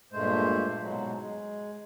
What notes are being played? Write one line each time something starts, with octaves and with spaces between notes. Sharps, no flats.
G2 A#2 G#3 A3 C5
G#2 B2 F#3 G#3
G#3